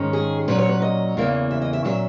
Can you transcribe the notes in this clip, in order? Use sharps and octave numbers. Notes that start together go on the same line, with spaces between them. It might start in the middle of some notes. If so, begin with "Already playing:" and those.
Already playing: G#2 D#3 G#3 C#4
G#4
A#2 F#3 C#4 B4
C#5
B4
D#5
E2 C#3 E3 A#3
E5
D#5
E5
A#2 F#3 C#4 E5